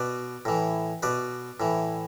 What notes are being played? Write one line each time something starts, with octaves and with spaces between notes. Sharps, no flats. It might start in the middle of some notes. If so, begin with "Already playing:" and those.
Already playing: B2 B4 D5
A2 E3
B2 B4 D5
A2 E3